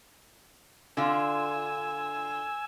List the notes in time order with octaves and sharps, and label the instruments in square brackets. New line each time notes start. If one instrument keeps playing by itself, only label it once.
[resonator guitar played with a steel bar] D3 F4 [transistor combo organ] G#5 E6